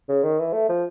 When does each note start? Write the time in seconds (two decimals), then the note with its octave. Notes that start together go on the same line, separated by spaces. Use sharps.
0.09 C#3
0.23 D#3
0.39 E3
0.53 A3
0.69 F3